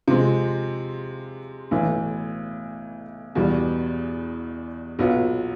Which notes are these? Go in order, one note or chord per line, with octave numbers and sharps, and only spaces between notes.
C3 F3 G#3 C4
B1 A2 E3
E2 B2 G3
B1 A#2 F#3 B3